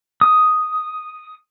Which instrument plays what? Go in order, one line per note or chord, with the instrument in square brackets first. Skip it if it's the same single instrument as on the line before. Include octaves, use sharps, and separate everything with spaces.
[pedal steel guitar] D#6